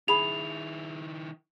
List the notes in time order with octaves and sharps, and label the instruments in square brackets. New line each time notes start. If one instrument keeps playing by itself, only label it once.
[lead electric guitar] D#3 E4 [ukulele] G#4 B5 [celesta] F7